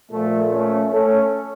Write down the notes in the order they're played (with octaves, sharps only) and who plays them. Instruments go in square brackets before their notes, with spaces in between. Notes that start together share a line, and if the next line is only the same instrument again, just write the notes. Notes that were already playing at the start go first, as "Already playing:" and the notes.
[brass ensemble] A#2 F3 A3
A3 C#4
A3 C#4